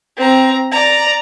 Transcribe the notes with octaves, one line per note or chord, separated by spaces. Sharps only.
C4 A#5
D5 A#5